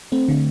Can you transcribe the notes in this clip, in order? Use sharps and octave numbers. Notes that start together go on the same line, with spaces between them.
A3 C4
D3